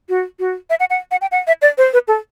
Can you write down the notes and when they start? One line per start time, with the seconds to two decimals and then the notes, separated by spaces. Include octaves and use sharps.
0.09 F#4
0.39 F#4
0.70 E5
0.80 F#5
0.90 F#5
1.11 F#5
1.21 G5
1.32 F#5
1.47 E5
1.62 D5
1.78 C5
1.93 B4
2.08 A4